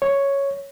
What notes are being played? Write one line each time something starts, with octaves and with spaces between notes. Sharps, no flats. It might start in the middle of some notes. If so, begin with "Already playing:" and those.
C#5